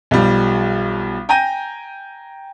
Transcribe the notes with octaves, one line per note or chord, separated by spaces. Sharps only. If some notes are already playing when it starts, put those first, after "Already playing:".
B1 F3 G3
G5 G#5 A#5 G6 A#6 D#7